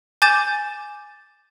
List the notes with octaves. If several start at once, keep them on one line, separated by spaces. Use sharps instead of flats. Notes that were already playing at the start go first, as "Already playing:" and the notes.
G#5 D6 G6 A6 E7